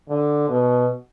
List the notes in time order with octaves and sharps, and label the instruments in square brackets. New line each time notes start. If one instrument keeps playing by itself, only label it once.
[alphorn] D3
B2